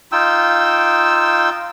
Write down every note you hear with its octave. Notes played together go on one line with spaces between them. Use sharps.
D#4 F4 G5 E6